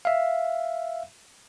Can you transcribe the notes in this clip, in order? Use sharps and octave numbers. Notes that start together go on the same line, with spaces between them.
E5 F5